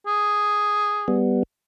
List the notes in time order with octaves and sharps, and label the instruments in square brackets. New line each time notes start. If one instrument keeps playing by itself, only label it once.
[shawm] G#4
[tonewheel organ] G3 B3